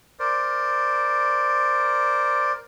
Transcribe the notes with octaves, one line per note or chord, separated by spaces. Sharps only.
A#4 C5 D5